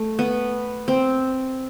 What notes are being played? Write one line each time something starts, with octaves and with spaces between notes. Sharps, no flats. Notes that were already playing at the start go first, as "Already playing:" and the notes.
Already playing: A3
B3
C4